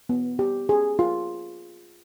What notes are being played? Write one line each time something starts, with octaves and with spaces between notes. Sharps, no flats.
B3
G4
G#4
F4